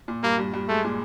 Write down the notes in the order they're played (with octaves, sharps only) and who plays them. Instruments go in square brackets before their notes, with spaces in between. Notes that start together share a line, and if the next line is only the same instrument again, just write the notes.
[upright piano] A#2
[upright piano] G2 [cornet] A#3
[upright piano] G2
G2
[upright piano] G#3 [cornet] A3
[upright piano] A#2